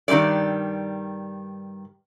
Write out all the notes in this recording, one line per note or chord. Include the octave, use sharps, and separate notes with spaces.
G2 D#3 F3 G3 D5